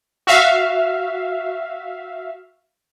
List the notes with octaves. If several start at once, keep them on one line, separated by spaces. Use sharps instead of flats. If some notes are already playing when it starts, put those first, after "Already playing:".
F#4 E5 F5